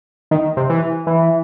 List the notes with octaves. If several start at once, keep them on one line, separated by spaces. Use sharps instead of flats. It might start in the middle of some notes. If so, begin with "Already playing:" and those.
D#3
C3
E3
E3